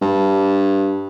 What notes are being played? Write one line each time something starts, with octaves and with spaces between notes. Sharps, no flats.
G2